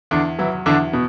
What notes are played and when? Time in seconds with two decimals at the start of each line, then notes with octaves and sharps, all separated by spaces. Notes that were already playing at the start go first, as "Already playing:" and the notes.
0.11 E2 D3 D4
0.39 E3 F#3 E4
0.66 E2 D3 D4
0.93 B2